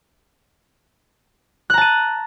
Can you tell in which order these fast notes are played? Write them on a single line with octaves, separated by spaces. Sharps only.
F#6 A#5 A5 D#7